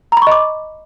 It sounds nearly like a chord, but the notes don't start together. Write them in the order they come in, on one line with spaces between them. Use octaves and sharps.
A#5 B5 C#6 D#5 D6